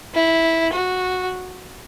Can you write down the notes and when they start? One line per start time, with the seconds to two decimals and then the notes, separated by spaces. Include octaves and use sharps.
0.15 E4
0.73 F#4